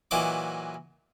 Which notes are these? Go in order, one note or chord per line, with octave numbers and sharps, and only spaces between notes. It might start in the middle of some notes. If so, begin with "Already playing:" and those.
A#2 E3 F#3 D#5 D6